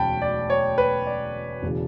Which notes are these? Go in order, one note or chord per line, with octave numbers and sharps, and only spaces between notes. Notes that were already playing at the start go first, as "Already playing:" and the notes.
Already playing: E1 D2 F#3 C#4 G5 A5 B5
D5
C#5
B4
D5
E1 C#3 E3